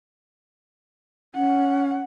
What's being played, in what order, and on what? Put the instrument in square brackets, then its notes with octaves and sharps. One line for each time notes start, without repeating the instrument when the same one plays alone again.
[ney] C#4 [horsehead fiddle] F#5